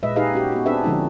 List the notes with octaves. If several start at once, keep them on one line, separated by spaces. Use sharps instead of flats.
A#2 G#3 B4 D#5 E5
D#4 G4 G#4 B4 D#5 F5
C#4 F#4 G4
B3 F#4
C4 D4 G#4 B4 E5
D3 F3 G#3 C#4 D#4